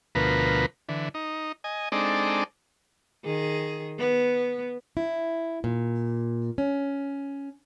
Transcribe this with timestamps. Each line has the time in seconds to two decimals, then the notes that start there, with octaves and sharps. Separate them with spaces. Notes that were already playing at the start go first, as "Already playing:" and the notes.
0.15 D2 B2 F3 A#4 B4
0.89 D3 E3
1.14 D#4
1.64 D#5 G#5
1.92 G#3 C4 D4 D#4 A4 D5
3.25 D#3 G#4
3.98 B3
4.97 E4
5.64 A#2
6.58 C#4